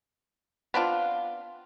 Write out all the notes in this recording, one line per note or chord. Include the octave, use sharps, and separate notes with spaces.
B3 C4 D4 F4